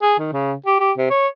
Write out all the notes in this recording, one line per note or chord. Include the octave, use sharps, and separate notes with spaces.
G#4
D#3
C#3
G4
G4
C3
C#5